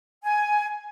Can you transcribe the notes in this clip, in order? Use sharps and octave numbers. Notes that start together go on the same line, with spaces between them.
G#5